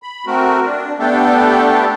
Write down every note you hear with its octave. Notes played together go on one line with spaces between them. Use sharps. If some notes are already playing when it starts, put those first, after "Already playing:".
B5
A3 C4 F#4 A#4
D4
A3 B3 D4 G4 A4